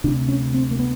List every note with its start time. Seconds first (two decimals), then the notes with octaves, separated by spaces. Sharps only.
0.04 D2 C3 D4
0.29 C#4
0.54 C4
0.71 A#3
0.79 B3